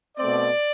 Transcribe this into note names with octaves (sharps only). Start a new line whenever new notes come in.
B2 A3 C4 D5